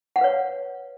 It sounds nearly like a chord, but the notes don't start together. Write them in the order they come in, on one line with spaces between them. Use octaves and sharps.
F#5 F5 B4 C#5